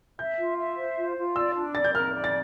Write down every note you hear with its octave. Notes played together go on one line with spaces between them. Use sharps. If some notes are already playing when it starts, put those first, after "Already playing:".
E5 G6
F4
E5
C5
F4
F4
D5 E6
D4
D5 A6
G6
A#4 F6
D5
A6